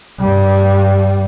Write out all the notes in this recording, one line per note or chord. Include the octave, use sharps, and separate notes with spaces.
G2 G3